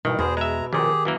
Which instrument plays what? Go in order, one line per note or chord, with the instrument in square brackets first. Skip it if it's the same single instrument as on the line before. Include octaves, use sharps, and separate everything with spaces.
[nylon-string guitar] G2 E3 [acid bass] B2 [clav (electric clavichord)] D#3
[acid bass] E2 [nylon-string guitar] B2 [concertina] G#4 C5
[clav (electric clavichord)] G#3 E5 [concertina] A#5
[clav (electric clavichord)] A#1 A#2 [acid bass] D#3 [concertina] G4 G#4
[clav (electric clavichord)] F#2 E3 A#3